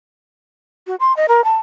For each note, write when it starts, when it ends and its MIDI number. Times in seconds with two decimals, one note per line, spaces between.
0.87 0.96 66
1.00 1.15 84
1.17 1.26 75
1.28 1.44 70
1.44 1.57 81